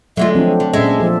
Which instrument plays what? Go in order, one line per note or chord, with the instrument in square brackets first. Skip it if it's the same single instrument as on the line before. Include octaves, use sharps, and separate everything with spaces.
[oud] D3 G#3 F4 [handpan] F#3 A3 [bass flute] E5
[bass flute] F3 [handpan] C4 D4
[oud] D3
[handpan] A#2 D4 E5 [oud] G#3 [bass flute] C#4
[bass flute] F3 [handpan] A4